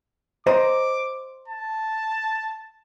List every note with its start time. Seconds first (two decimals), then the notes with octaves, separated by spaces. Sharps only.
0.47 C5 D#5 A#5 D6
1.48 A5